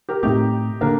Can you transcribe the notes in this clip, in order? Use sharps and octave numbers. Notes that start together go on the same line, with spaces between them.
G4 A#4
A2 A3 C4 D#4 G4
D3 A#3 D4